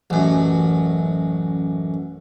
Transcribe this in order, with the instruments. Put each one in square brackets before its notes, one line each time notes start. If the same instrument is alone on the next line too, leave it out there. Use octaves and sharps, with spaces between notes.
[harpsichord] A1 F#2